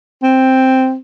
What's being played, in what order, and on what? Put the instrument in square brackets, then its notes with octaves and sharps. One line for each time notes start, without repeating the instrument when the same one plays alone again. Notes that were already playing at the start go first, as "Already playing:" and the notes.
[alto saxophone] C4